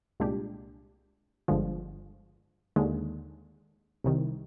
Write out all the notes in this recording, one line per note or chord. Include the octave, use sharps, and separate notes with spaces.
C2 A#2 G#3 D4 G4
G1 G2 D3 F3 G#3
D#2 D3 G#3
C2 C3 D#3